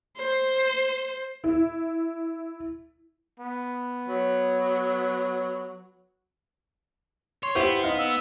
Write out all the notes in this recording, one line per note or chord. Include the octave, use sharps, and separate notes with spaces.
C5
E4
B3
F#3
C#5 C6
B3 E4 G4 C5
D#4 F5
E6